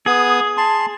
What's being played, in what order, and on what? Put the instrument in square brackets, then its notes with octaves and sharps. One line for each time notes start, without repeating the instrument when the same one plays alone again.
[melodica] B3 D#6 [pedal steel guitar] G#4
[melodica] A5 C6